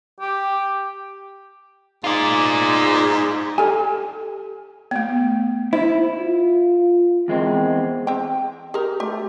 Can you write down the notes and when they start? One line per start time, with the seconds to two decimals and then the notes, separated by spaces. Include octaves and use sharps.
0.20 G4
2.04 G#2 F4 D5
3.58 G4 A4 G#5
4.91 A3 B3
5.73 E4 C5
6.20 F4
7.28 E2 G#3 C4
8.07 C4 G5
8.74 G4 G#4 A#4
9.00 A3 G4